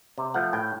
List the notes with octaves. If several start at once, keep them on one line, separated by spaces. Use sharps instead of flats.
C3
F3 A3 F#5
A2 G5